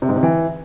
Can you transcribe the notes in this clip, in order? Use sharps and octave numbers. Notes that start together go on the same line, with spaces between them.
C3
G#2
C3
E3